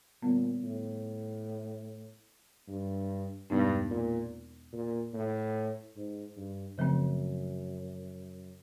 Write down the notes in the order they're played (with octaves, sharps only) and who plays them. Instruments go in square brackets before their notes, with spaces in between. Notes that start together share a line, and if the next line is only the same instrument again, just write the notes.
[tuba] A#2 [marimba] D3 G3 B3
[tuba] A2
G2
[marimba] E2 B2 G#3 B3 D#4 [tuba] G2
[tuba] A#2
A#2
A2
G#2
G2
[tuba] F#2 [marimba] C#3 F3 A3 C4